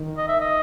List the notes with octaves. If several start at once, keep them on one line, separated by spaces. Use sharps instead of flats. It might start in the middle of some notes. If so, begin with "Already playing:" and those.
Already playing: D#3
D#5
E5
D#5